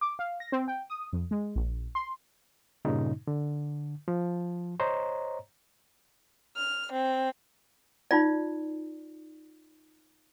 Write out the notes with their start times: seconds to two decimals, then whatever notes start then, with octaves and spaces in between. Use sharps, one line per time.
0.01 D6
0.19 F5
0.40 A#6
0.52 C4
0.68 G5
0.90 D#6
1.13 F2
1.31 G#3
1.55 A#1
1.95 C6
2.85 G2 A#2 C#3 D#4
3.27 D3
4.08 F3
4.80 C5 C#5 D#5 A#5
6.57 F6
6.92 C4
8.11 D#4 F4 D5